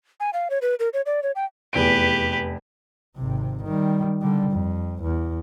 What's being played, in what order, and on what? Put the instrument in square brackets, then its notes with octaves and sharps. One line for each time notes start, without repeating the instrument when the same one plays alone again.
[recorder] G#5
F5
C#5
B4
A#4
C#5
D5
C#5
G5
[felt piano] F1 E2 D7 [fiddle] G4 B4
[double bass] G#1 C3
D#3 G3
D3 G3
F2
E2